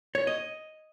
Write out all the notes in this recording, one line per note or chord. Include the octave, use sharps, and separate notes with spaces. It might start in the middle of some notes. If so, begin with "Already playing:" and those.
C#5
D#5